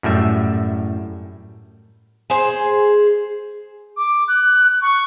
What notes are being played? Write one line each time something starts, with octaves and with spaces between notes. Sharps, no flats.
F#2 A2 G3 E5
G#4 C5
D6
F#6
C#6